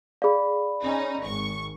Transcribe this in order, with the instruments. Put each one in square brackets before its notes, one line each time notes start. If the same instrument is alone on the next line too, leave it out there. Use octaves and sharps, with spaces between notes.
[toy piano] G#4 F5 [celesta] D5 B5
[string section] C#4 D#4
G#1 C#6